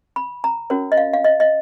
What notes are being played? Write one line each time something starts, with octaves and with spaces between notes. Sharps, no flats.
B5
A#5
C#4 F#4 A#4 C#5
D#5
F5
F5
D#5
D#5